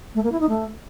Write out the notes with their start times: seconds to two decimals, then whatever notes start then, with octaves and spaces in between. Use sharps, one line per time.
0.15 A3
0.23 A#3
0.32 E4
0.40 D#4
0.49 A3